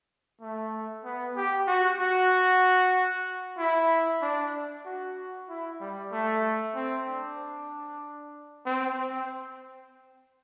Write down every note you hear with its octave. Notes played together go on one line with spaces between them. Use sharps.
A3
B3
G4
F#4
F#4
E4
D4
F#4
E4
G3
A3
C4
D4
C4
C4